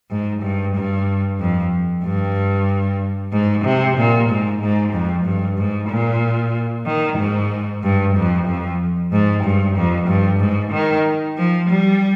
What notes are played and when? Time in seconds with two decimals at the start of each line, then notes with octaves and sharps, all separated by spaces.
0.10 G#2
0.43 G2
0.75 G2
1.40 F2
2.04 G2
3.32 G#2
3.65 C3
3.97 A#2
4.29 G#2
4.62 G#2
4.93 F2
5.25 G2
5.58 G#2
5.89 A#2
6.86 D#3
7.18 G#2
7.83 G2
8.16 F2
8.47 F2
9.12 G#2
9.44 G2
9.76 F2
10.08 G2
10.40 G#2
10.72 D#3
11.37 F3
11.69 G3